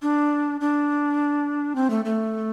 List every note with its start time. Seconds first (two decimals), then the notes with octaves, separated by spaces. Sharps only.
0.02 D4
0.61 D4
1.76 C4
1.90 A3
2.05 A3